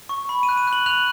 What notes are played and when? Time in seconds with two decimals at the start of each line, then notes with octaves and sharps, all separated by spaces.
0.09 C#6
0.29 B5
0.43 D#7
0.49 F#6
0.57 D#7
0.67 F#6
0.73 F#7
0.86 F#6 F7